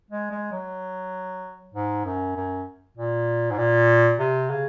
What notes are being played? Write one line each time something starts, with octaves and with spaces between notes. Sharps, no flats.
G#3
G#3
F#3
G#2
F#2
F#2
A#2
G#2
A#2
C3
C#3